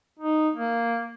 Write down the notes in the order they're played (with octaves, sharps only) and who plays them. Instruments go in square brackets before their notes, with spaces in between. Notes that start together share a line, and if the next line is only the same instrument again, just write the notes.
[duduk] D#4
A#3